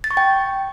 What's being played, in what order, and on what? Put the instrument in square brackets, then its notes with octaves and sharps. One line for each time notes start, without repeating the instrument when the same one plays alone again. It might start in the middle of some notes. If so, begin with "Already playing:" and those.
[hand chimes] A6
C#6
G5